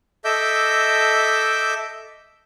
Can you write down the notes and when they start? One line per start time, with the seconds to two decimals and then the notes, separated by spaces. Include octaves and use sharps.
0.25 A4 D#5 E5 D6 E6 G6